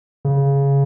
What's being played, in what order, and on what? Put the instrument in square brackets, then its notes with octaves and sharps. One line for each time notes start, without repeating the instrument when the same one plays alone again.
[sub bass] C#3